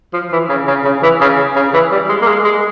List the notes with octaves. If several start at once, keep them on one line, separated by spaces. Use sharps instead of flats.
F3
E3
C#3
C#3
C#3
E3
C#3
C#3
E3
G3
G#3
A#3
G#3
G#3